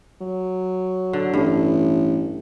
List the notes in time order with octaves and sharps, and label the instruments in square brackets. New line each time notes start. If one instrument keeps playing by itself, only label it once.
[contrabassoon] F#3
[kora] D3
[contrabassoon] A1 [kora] G2